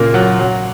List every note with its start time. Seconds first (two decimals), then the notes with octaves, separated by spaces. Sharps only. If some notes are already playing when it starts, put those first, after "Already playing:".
Already playing: A#2 C#3 A#3
0.14 F#3
0.39 F#3